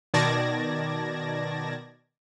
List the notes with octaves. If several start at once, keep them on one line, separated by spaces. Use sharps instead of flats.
B2 D#3 D5 A5 G#6 A#6